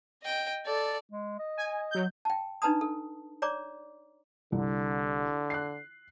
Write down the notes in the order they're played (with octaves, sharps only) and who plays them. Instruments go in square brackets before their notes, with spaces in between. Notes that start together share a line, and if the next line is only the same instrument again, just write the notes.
[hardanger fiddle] D#5 G5
A4 D5
[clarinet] G#3
D#5
[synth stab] G#5
F#3 G6
[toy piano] G5 A5
D4 D#4 B4 A5 A#5 D#6
A4
C#5 D5 A#5 D6
[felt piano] C2 [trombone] D3
[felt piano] F#6 C7